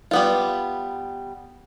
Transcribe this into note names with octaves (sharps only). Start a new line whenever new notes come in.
G3 B3 F4